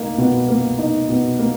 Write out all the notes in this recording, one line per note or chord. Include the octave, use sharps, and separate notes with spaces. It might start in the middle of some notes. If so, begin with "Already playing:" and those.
Already playing: A#3 D#4
B2
A#3
D#4
B2
A#3